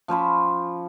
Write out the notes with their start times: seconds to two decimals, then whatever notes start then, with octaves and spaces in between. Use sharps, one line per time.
0.08 F3 C#4 C5 B5